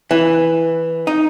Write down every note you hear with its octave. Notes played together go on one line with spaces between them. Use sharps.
E3
D#4